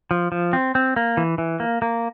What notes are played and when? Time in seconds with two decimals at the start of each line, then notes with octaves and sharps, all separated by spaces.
0.11 F3
0.32 F3
0.53 C4
0.75 C4
0.96 A#3
1.17 E3
1.38 E3
1.60 A#3
1.82 A#3